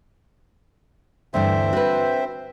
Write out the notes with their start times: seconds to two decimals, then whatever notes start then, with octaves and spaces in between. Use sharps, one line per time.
1.34 D2 G2 E3 C4 C5 E5
1.73 F#4 B4